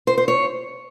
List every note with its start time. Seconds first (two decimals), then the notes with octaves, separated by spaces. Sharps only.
0.07 C5
0.18 C5
0.28 C#5